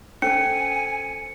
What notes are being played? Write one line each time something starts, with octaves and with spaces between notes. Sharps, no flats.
C#4 A4 C5 G#5 C#7